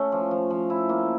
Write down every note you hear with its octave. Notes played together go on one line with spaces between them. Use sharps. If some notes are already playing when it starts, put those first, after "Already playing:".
Already playing: A3 C#4
F3
F3
F3
E4
A#3